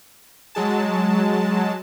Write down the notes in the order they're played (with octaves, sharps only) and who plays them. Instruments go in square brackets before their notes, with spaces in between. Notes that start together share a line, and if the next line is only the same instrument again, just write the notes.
[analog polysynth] F#3 G#3 A5